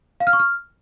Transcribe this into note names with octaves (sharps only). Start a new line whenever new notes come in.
F5
F6
C#6
F6